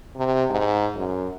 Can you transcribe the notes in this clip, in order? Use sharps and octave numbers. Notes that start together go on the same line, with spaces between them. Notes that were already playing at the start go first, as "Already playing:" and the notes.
C3
G#2
F#2